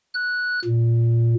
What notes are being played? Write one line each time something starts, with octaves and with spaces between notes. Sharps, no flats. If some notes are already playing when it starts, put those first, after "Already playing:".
F#6
A#2